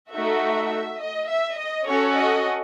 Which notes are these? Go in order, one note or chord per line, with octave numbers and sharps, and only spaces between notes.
A3 D#4 F#4 A4 E5
D#5
E5
D#5
C#4 F#4 A4 C#5
D#5